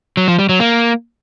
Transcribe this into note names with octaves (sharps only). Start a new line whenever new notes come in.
F#3
F3
G3
F#3
A#3